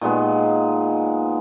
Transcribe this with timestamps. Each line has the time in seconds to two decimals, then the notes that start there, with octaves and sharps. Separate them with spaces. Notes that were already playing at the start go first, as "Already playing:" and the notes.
0.01 A#2 D#3 G#3 B3